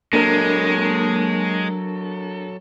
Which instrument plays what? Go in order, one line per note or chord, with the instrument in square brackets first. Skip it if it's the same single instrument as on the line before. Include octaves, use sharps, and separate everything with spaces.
[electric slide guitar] F#3 A4 [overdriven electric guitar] G#3 [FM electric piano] A#3 [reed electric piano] D4 A#4